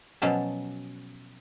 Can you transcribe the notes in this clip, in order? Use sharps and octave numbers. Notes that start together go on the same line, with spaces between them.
B2 F3 F#3 C#4 A5